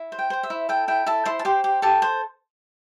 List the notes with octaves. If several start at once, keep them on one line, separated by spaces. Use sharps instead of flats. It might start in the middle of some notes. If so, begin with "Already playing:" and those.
Already playing: E4
C5
G5
C5 G5
E5
E4
A4 G5
E4 G5
E4 A4 A5
E4 C5 C6
A5
G4 C5 C6
G4
G4 A4 A5
C5